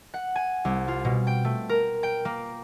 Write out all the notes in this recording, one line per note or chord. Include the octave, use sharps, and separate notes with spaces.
F#5
G#5
C2
F4
B2
G5
A3
A#4
G5
A#3